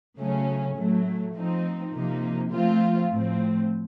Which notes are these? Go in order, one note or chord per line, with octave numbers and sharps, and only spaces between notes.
C#3 F#3 A3 C#4
A2 F#3 A3
F3 C4 D#4
C3 F3 A#3 D#4
F3 A3 C4 F4
A2 F3 C4